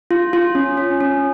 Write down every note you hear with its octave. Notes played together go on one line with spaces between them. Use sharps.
F4
F4
C#4
C#4
C#4